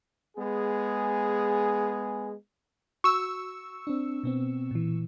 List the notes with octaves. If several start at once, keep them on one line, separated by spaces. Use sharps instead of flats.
G#3 B3 G#4
F#4 C#6 E6
C4 D4
B2 B3 C4
A#2 E3